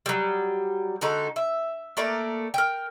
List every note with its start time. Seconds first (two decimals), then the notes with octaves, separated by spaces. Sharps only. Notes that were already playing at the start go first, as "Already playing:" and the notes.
0.06 F#3 G3
1.01 D3 G#3 D#4 F#4
1.36 E5
1.97 A3 A#3 D5 A#5
2.54 A#4 G5